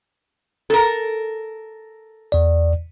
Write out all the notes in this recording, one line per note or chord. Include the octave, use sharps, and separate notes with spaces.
A4 A#4
E2 D5